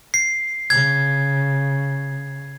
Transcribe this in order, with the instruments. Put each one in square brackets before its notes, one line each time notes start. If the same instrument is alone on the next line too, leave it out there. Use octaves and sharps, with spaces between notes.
[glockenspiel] C7
[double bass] C#3 [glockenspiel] G#6